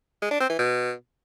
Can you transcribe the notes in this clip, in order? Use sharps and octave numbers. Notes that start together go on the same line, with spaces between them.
G#3
D4
C4
E3
B2